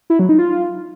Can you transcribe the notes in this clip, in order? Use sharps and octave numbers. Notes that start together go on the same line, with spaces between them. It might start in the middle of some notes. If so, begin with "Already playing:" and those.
E4
F#3
D#4
F4